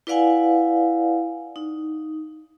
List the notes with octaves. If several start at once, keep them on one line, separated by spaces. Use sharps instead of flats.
E4 B4 D5 F5 F#5 G#5
D#4